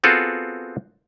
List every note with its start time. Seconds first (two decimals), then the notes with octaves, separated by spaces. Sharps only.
0.04 B3 C4 F4 F#4 G#4 A4